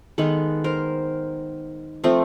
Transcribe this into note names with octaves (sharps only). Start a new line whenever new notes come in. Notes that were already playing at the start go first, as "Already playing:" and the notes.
D#3 G#3 B3 A4 B4
A#4 C5
F3 A3 C4